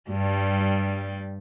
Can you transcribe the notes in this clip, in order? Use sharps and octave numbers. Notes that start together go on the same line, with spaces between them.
G2 G3